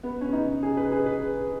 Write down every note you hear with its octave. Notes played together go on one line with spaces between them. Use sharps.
B3
C#4
D#4
G#4
B4
G#4
B4